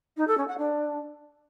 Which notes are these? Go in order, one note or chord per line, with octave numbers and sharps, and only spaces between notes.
D#4
A4
C#4
F#5
D4